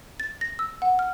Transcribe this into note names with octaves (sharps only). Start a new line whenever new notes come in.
A6
A#6
E6
F#5
F6